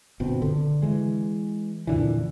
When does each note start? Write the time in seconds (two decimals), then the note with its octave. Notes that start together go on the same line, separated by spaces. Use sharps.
0.20 G1 B2 C4
0.42 D3
0.82 E3 G#3
1.87 F2 A#2 D3 E3